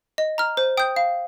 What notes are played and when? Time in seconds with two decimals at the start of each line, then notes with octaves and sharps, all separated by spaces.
0.18 D#5
0.38 A#5 F6
0.57 C5
0.77 G5 D#6 G6
0.96 F5